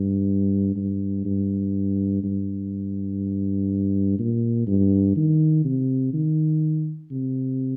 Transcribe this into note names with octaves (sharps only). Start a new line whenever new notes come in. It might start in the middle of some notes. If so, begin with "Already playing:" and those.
Already playing: G2
G2
G2
G2
A#2
G2
D#3
C3
D#3
C3